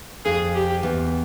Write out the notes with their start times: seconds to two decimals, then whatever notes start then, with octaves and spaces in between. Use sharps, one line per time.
0.25 F2 G#4
0.54 G4
0.83 E2